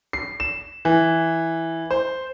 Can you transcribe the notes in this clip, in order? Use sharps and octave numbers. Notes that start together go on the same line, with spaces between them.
C7
E7
E3
C5